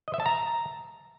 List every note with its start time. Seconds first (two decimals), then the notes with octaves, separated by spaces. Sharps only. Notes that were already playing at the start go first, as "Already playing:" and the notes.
0.08 D#5
0.14 E5
0.20 A5
0.26 A#5